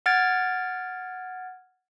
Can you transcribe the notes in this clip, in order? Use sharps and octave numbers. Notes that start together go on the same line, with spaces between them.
F#5 F6 G#6 A6 D7